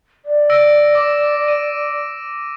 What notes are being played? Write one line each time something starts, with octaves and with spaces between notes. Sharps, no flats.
D5
E6 A#6 D7
D6
D#7